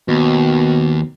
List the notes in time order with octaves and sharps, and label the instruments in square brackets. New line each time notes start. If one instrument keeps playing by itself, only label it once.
[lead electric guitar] D#2 [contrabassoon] B2